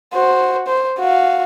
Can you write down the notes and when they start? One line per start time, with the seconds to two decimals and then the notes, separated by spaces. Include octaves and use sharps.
0.13 F#4 C5
0.68 C5
0.99 F#4 F5